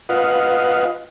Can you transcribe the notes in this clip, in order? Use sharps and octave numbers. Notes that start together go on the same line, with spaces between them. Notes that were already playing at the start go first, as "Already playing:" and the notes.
F4 B4 D#5 F5 F#5